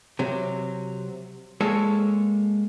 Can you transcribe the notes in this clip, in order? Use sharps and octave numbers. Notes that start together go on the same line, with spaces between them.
C3 F#3
G#3 A#3 A4 C#5